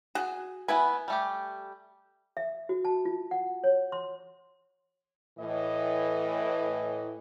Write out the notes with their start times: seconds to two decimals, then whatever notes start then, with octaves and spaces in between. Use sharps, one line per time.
0.15 F#4 G#4
0.68 B3 E4 B4 G#5
1.08 G3 A3 G4
2.37 E5
2.69 F#4
2.85 A5
3.05 F4
3.31 F#5
3.64 C#5
3.92 C6
5.39 A2 E3 D#5